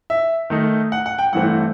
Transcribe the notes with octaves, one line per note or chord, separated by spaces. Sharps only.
E5
D#3 A3 D#4
F#5
F#5
G5
G2 E3 A3 C4 F#5